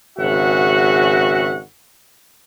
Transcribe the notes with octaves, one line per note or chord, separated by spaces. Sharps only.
G#1 C#3 F#4 E5 F#5